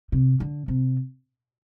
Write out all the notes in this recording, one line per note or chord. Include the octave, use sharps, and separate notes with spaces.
C3
D3
C3